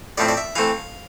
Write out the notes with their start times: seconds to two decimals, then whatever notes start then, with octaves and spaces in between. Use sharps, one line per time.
0.17 A2 F3 A3 C4 D5
0.28 D5
0.37 E5
0.55 E3 A3 C4 F5